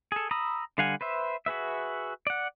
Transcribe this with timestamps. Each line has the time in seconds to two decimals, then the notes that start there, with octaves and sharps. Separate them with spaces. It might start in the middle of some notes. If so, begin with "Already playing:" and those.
0.12 G#4 A4
0.31 A#5 B5 D#6 E6
0.78 D3 G3 F5 F#5 G#5
1.01 B4 C5 E5
1.46 F#4 G#4 B4 E5
2.27 D5 F#5